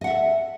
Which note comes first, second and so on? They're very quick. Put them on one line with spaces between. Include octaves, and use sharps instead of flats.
D#5 F#5 E5 A4